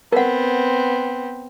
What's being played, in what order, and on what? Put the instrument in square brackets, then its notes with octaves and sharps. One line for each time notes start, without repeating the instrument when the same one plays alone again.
[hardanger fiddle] B3 C4 [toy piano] A#4 F#5